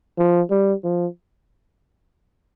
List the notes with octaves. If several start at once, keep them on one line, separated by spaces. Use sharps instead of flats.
F3
G3
F3